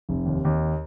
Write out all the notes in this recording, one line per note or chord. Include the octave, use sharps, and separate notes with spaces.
F1
D#2
D#2